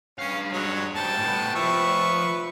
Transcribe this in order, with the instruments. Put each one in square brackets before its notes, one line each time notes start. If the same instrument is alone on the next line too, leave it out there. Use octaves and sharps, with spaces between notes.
[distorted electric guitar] G2 F5 [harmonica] C#4
[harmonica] F#3 G#3 C#5
[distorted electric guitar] G#2 G3 [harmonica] G5 A5
[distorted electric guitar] A2 B3
[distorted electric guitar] F3 G4 [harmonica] B4 E5 C#6